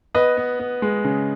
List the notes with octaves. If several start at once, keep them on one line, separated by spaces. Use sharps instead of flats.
B3 B4 D#5
B3
B3
G#3
C#3